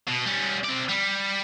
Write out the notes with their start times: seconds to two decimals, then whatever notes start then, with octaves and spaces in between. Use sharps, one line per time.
0.07 B2
0.26 G3 C#4
0.64 C4 D5
0.89 G3